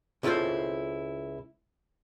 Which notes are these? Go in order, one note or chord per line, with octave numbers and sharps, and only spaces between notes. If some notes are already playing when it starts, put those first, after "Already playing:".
C#2 E4 F4 A4 C5